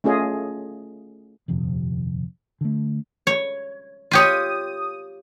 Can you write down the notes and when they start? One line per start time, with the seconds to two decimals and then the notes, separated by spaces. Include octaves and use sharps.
0.04 A3 C#4 F4 G#4 D#5
1.48 D#1 F2 C3
2.61 D3 A3
3.27 C#5
4.11 F4 G4 C#5 D#6 D#7